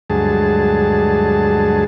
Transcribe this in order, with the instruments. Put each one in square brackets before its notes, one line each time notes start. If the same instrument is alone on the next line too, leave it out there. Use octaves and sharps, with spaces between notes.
[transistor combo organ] D2 G2 F#3 G#3 G#4 A5